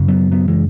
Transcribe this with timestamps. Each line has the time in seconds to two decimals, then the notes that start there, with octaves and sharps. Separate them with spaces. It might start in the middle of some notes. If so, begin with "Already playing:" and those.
Already playing: F#2 C#3
0.08 F#3 B3
0.32 F#3 B3
0.48 E3 G#3